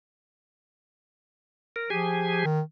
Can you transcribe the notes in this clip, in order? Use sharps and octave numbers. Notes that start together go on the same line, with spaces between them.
A#4
F3 G4 G#4 G#5
D#3